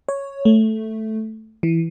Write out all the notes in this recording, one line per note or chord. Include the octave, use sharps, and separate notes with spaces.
C#5
A3
E3